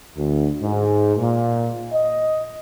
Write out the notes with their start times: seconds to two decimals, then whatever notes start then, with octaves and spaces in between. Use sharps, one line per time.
0.17 D2
0.62 G#2
1.17 A#2
1.93 D#5